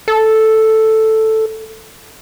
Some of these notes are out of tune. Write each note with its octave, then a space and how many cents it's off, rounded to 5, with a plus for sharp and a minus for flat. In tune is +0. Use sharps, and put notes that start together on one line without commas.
A4 +0